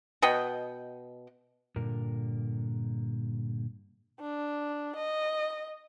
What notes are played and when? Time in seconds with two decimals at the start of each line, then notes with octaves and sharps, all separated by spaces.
0.22 B2 D#5 F#5 G5
1.76 G2 A#2 D3 A#4
4.20 D4
4.96 D#5